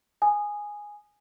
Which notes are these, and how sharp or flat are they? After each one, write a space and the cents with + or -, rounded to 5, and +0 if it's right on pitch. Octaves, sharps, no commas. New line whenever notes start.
G#5 +0 D#6 -20